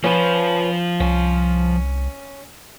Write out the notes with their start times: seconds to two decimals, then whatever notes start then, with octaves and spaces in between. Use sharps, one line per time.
0.04 F3 C#4 F4 B4
1.00 C2 C#4